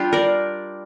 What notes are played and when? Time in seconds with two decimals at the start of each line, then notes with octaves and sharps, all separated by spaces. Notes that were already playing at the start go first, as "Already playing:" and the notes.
Already playing: G3 D4 F4 G4
0.13 A#4 D5